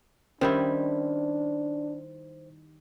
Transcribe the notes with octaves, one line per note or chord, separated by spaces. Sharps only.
D#3 G3 C#4 D4 E4 C5